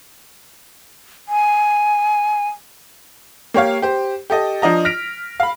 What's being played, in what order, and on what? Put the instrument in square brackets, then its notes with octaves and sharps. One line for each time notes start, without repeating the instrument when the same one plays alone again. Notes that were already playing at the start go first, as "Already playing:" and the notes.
[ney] G#5
[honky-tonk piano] A#3 G4 C#5 F5
G4 C5
G4 A4 D#5
F3 D4 D#5 A#5
F6 A#6 B6 D7 F7
F5 B5